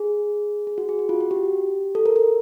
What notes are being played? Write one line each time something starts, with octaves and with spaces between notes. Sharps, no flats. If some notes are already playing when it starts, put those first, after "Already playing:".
Already playing: G#4
G#4
F#4
G#4
F#4
F4
F#4
G4
A4
A#4
A#4